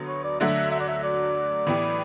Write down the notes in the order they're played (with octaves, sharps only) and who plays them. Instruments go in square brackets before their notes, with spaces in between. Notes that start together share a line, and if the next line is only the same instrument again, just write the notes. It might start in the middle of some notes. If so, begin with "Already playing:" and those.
Already playing: [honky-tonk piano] D2 D3 F#3 B3
[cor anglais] C#5
D5
[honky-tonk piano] D3 F#3 A3 D4 F#4 [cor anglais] E5
[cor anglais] E5
D5
E5
D5
[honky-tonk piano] A2 E3 B3 E4 G4